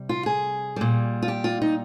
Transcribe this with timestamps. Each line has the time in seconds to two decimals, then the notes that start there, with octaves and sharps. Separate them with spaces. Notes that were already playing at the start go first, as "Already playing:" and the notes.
Already playing: C3 G3
0.09 F4
0.26 G#4
0.76 A#2 G3
1.22 F4
1.28 G4
1.44 F4
1.62 D#4